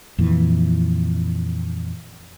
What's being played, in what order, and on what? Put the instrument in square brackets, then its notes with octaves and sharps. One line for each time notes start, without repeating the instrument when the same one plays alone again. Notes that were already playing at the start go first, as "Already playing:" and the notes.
[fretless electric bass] F2 A#2 E3